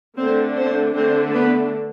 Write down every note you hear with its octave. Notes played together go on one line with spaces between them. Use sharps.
D3 A3 C4 D4 C5
C4 C5
D3 A3 C4 D4 C5
B3 B4